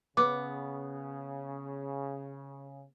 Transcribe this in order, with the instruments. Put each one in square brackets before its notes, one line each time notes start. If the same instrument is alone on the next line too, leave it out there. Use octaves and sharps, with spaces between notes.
[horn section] C#3 [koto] B3 [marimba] D6